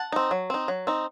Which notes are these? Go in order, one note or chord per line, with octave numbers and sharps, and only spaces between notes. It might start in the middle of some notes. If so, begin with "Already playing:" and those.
Already playing: F#5 A5
C4 D#4
F#3
C4 D#4
F#3
C4 D#4